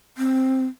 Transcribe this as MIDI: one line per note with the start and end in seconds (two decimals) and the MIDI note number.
0.18 0.66 60